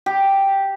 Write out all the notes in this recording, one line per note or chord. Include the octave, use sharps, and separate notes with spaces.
G4